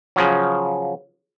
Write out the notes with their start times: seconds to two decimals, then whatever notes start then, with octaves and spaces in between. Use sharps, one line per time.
0.16 C#3 F3 F#3